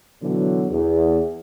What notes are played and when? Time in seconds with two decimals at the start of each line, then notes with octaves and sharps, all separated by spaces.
0.22 B2 D3 E3 F#3
0.70 E2